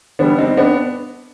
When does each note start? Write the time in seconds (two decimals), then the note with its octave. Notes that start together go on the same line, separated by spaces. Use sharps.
0.19 D3 G3 B3 D4
0.38 C4 D#4
0.57 B3 D4